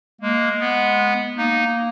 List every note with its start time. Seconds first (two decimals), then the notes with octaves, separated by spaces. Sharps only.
0.21 G#3 A#3
0.60 B3
1.37 A#3 D#4